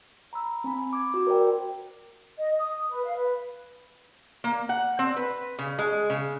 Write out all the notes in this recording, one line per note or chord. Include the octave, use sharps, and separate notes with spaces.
A#5 B5 E6
C4 G#5 B5
D6 G#6
F#4
A#4 C5 D5 G5
D#5
D#6
B4
F5
B4
A#3
F#5
C4
B4
C#3
G#3
C#3